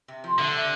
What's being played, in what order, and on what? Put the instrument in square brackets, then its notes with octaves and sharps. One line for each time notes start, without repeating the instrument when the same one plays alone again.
[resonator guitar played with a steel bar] C3
F3
[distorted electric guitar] D3 [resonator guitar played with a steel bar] A3
[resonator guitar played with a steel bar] C3